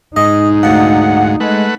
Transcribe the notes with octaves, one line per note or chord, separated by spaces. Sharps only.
G#2 D#4 D#5
D2 F3 F#5
G#3 A3 B4 F#5